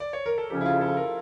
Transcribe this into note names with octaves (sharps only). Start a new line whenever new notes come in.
D5
C#5
A#4
A4
F2 C#3 F3 C#4 G4
E4
F4
A4
A#4